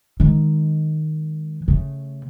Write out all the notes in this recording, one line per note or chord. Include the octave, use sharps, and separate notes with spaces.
D#3 G#3
C#3 A3